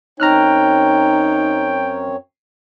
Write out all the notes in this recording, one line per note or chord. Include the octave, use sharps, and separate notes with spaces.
F#2 C4 D#4 C#5 G5 A#5 F6 F#6